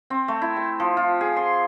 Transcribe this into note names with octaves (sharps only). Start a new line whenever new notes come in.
C4
A3
E4
C6
F3
F4
G#4
C6